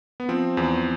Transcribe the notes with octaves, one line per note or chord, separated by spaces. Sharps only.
B3
F3 C4
E2